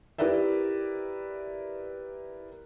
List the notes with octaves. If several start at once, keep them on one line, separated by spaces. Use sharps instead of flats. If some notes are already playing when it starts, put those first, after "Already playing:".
E4 G4 A#4 B4 D5 E5